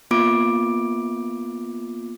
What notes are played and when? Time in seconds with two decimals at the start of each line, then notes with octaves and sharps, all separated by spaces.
0.11 A#3 B3 F4 D6 D7